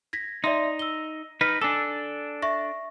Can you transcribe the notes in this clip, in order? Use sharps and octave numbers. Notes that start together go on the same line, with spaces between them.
G#6 A#6 B6
D#4 D5 E5 C6
E6 G7
D#4 B4 F6
D4 A4 G#5 D6 E6
E5 C#6 A#6